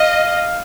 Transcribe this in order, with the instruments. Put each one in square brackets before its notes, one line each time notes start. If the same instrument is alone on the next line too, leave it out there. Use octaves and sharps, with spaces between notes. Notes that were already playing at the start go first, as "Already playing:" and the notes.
Already playing: [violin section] D#5 [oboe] F5